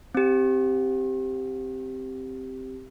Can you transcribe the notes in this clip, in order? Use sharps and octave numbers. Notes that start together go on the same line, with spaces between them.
C4 G4